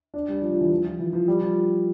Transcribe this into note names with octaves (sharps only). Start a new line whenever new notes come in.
D4
G3
F3
F3
E3
F3
F3
E3
F3
G3
F3